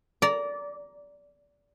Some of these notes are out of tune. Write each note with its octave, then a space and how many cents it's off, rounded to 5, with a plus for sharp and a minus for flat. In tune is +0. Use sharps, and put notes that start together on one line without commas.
D5 -20 A#5 +0